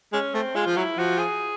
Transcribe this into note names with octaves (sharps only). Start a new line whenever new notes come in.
G#3 C#4
A3 C4
G#3 F4
F3
F#3 E4
F3 F#4
G#4